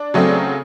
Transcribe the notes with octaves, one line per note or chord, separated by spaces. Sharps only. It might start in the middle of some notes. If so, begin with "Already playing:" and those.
Already playing: D4
C#3 F#3 A3 C4